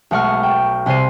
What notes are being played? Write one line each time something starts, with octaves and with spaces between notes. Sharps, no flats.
B1 G#3 A3 F#5 C#6 F6
G5
C2 C3 C5 C7 D#7